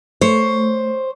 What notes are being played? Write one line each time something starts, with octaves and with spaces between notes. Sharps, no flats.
A3 C5 C#5